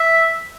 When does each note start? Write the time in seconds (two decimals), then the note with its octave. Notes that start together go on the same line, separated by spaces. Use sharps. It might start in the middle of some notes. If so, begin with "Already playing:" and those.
Already playing: E5